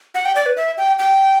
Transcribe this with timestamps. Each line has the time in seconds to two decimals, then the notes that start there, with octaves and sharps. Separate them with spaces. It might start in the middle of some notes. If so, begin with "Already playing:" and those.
0.15 F#5
0.25 G5
0.36 D5
0.46 B4
0.57 E5
0.78 G5
0.99 G5